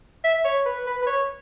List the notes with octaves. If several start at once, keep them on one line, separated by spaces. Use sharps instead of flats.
E5
C#5
B4
B4
B4
C#5